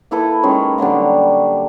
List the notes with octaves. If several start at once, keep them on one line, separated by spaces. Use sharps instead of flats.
A#3 E4 A4 B4
D#3 G#3 C#4
D3 F#3 G3 A#3